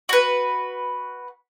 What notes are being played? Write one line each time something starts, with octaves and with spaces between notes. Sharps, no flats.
F#4 B4